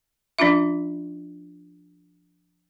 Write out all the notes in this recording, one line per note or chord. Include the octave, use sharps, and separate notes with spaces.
F3 C#4 D4 F4 E5